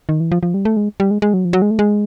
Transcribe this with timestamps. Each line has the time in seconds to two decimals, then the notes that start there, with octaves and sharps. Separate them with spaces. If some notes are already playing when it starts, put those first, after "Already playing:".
0.09 D#3
0.20 E3
0.32 F3
0.43 F3
0.54 G3
0.65 A3
0.77 G#3
1.00 G3
1.11 G#3
1.22 G#3
1.34 F#3
1.45 F3
1.53 F#3
1.62 G#3
1.71 A3
1.79 G#3